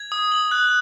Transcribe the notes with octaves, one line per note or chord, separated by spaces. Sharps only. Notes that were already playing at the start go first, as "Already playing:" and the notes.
Already playing: G#6
D#6
F#7
F#6